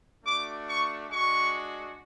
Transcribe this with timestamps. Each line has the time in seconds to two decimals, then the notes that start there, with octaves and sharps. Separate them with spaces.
0.24 A3 D4 F#4 D6
0.67 C#6
1.09 G#3 D4 F#4 C#6